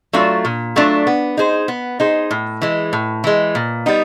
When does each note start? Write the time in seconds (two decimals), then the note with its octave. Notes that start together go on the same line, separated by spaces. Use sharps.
0.13 F#3 A3 D4 F4
0.45 A#2
0.76 F#3 A3 D4 F4
1.07 B3
1.37 D#4 G#4 C5
1.68 B3
2.00 D#4 G#4 C5
2.31 A2
2.62 E3 G#3
2.93 A2
3.24 E3 G#3
3.55 A#2
3.86 G3 B3 D#4